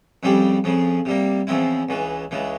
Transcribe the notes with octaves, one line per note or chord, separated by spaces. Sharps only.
F2 C#3 G3 C4 G4
F2 C#3 F3
C3 G3 A#3
E2 C#3 F3 C4 E4
C#2 C#3 E3
C#2 C#3 E3